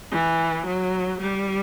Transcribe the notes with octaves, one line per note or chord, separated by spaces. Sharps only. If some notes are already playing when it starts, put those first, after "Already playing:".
E3
F#3
G3